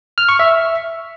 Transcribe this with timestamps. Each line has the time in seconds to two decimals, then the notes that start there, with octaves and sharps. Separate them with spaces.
0.18 F6
0.29 C#6
0.39 E5